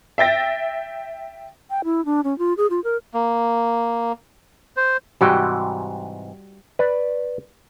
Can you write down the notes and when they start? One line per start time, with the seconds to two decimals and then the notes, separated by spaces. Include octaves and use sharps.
0.18 E5 G5 A6 A#6
1.70 G5
1.84 E4
2.05 D4
2.24 C#4
2.39 F4
2.57 G#4
2.70 F4
2.84 A#4
3.14 A#3
4.77 C5
5.21 G#2 C3 E3 G3 F#4 G5
6.79 B4 D5